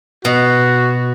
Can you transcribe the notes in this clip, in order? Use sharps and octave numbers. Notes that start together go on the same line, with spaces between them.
B2 F#4